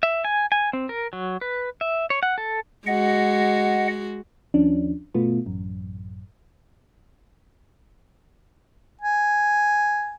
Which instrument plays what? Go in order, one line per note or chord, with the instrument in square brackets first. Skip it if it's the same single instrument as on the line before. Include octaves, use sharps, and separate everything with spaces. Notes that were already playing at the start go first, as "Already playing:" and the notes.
[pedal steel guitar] E5
G#5
G#5
C4
A#4
F#3
B4
E5
C#5
F#5
A4
[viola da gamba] G#3 F#4 [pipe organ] D#5 F#5
[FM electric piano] D#2 F3 C#4 D4
G1 B2 A3 B3 F4
A1 F#2
[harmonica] G#5